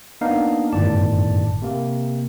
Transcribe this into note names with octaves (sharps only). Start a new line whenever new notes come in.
A#3 B3 D4 D#4 F5
G1 F#2 A2 D#3 D5 A5
C3 A#3